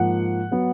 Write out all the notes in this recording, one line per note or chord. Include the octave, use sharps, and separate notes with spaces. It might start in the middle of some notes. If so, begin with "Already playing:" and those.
Already playing: G#2 F3 A#3 F#5
F#3 B3